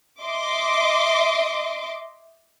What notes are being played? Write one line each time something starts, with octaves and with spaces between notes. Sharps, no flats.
D#5 E5 C6 D6